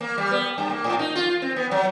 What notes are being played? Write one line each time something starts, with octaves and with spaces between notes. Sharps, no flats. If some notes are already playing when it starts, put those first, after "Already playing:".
A#3
G3
B3
G2
A#3
A2
D#4
F4
C4
B3
F#3